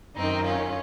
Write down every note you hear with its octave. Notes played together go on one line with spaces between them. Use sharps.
F#2 D#3 C4 D#4
C#4 F4